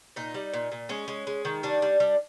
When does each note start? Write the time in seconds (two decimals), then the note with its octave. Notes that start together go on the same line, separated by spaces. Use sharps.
0.16 A#2 D#4
0.34 G3
0.54 A#2
0.72 A#2
0.89 G#3 C#4
1.08 G#3
1.27 G#3
1.45 D#3
1.63 G3 D4
1.82 G3
2.00 G3